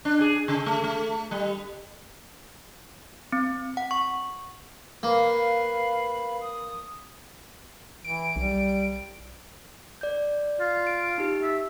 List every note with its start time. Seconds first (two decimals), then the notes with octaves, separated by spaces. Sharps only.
0.05 D4
0.21 G#4
0.48 C#3
0.66 A3
0.84 A3
1.31 G3
3.33 C4
3.77 F#5
3.91 C#6
5.03 A#3 B4 F5 B5
6.40 D#6
8.05 E3 D7
8.36 B1 G3
10.01 D5 G6
10.60 F4
10.87 D7
11.18 D#4 G4
11.43 E5